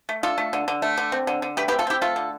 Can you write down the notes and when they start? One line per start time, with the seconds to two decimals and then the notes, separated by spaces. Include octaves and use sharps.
0.09 A3
0.23 D4 F4 A4
0.38 A3
0.53 D3
0.68 D3
0.82 A3
0.98 D3
1.12 C4
1.27 D3
1.42 D3
1.57 A3 G4 B4
1.68 G4 B4
1.72 C4
1.79 F4 A4
1.87 C4 E4 G4
2.01 A3 F4 A4
2.16 D3